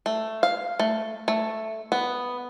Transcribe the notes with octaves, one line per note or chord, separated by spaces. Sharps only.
A3
F5
A3
A3
B3